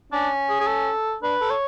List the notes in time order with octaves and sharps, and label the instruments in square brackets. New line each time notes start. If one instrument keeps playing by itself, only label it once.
[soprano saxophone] C#4 [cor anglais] D4
[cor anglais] G#4
G#4
A4
[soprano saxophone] D4 [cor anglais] B4
[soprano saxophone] A4
[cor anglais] C#5